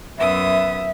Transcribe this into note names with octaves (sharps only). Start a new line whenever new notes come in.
F#2 B3 E5 D#6